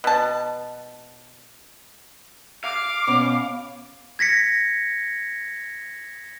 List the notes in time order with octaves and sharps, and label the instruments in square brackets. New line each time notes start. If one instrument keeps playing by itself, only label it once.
[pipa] B2 A5
[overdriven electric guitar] F5 [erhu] D6
[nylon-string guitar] B2 B3 C#4
[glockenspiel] G#6 A#6 B6 C#7